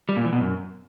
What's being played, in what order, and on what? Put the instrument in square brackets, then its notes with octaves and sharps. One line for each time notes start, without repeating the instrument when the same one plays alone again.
[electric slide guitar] G3
A#2
E3
B2
F#2